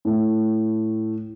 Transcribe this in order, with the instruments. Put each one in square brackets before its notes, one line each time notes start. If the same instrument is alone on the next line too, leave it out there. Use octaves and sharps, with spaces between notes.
[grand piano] A2